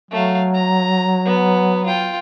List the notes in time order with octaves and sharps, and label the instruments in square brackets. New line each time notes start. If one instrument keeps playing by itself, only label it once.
[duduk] F#3 [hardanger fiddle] A3 F5
[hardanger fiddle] A#5
B3
F4 G5